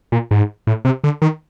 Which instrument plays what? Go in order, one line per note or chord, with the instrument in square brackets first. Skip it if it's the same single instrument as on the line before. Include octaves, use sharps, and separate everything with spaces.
[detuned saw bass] A#2
G#2
A2
C3
D3
D#3